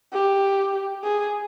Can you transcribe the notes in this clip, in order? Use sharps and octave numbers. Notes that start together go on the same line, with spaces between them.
G4
G#4